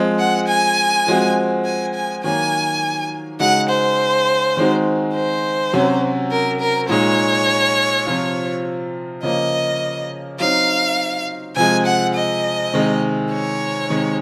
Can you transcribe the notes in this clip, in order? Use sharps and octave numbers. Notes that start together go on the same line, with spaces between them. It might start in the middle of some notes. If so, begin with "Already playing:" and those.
Already playing: F3 G#3 C4
F#5
G#5
F3 G#3 C4 F#4
G#5
G#5
D#3 F#3 A#3 G#5
C#3 G#3 D#4 F#4 F#5
C5
D#3 G#3 C4 D#4 F#4
C5
C3 F#3 C#4 F#4
A#4
A#4
A#2 G#3 D#4 C#5
C3 F3 C4 F4
C#3 F3 A#3 D#5
F#3 C4 D#4 F5
C3 F3 G#3 G#5
F#5
D#5
C3 D#3 G#3
C#5
C3 D#3 G#3